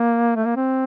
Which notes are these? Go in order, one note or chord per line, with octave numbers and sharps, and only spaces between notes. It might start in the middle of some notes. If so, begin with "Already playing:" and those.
Already playing: A#3
A3
A#3
C4